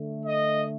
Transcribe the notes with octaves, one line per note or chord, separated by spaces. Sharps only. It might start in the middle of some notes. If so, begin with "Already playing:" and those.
Already playing: D3 A3
D#5